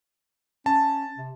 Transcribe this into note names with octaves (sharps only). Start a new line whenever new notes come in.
C#4 A5
C3